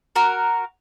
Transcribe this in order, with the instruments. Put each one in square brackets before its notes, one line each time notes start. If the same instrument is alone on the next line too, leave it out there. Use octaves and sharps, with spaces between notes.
[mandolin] F#4 A#4